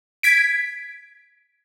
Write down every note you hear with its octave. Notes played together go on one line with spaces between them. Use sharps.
G#6 B6 D7